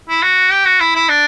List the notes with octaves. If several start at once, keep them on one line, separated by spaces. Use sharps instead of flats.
E4
F#4
G4
F#4
E4
E4
D4